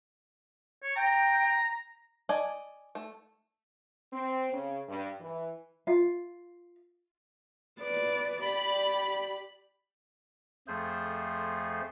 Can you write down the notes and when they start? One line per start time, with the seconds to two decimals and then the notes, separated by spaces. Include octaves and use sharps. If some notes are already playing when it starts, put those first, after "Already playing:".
0.83 C#5
0.96 G5 A#5
2.29 D5 D#5 G#5 A5
2.95 A3
4.12 C4
4.53 C#3
4.88 G2
5.20 E3
5.87 F4
7.80 B4 D5
8.44 G4 D5 B5
10.68 F2 F3 A3 G#4 C5